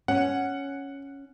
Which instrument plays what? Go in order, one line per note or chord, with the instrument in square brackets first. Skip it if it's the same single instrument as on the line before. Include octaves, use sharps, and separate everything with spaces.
[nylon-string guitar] C#4 [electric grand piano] F#5